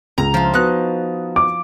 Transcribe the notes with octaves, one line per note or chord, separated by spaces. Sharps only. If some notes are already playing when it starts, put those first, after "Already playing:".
C#2 A#5
F3 F4
B3 D#4 F#4 F#6
D6